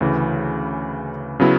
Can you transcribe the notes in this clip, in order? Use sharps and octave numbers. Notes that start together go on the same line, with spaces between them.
D2 C#3 E3
C#3 F#3 B3 E4